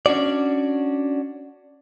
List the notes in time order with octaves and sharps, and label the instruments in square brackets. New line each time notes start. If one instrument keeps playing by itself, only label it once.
[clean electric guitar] C#4 D4 F#4 D5